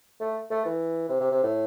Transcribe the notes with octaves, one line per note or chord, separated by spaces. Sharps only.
A3
A3
E3
C3
C3
C3
A2